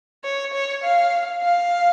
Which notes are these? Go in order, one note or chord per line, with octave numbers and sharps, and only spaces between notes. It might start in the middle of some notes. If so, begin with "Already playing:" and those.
C#5
C#5
F5
F5